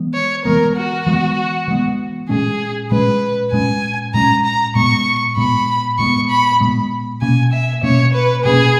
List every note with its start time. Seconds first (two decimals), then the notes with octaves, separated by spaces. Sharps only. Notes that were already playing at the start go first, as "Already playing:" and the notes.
Already playing: E3 G#3 B3
0.14 C#5
0.45 E3 G#3 B3 A#4
0.76 F#4
1.06 E3 G#3 B3
1.68 E3 G#3 B3
2.29 A#2 G#3 C#4 G#4
2.91 A#2 G#3 C#4 B4
3.52 A#2 G#3 C#4 G#5
4.14 A#2 G#3 C#4 A#5
4.45 A#5
4.75 A#2 G#3 B3 C#6
5.37 A#2 G#3 B3 B5
5.99 A#2 G#3 B3 C#6
6.29 B5
6.60 A#2 G#3 B3
7.22 B2 A#3 C#4 G#5
7.52 E5
7.83 B2 A#3 C#4 C#5
8.14 B4
8.45 B2 A#3 C#4 G#4